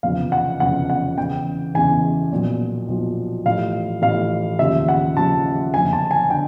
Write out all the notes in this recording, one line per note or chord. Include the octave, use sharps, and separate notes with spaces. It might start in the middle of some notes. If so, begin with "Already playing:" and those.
F1 E2 C#3 F3 F5
F#5
F1 E2 C#3 F3 F#5
F#5
E2 C#3 E3 G5
E2 C#3 E3 G#5
B1 A#2 F3
B1 A#2 F3
A1 A2 F3 F5
A1 A2 F3 F5
D#2 C#3 F3 E5
F#5
D#2 C#3 F3 A5
F#1 F2 D3 G#5
A5
G#5
D3 G5